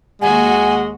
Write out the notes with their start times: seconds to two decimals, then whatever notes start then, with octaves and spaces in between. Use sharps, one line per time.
0.22 D#2 G#3 F#4 F#5 G#5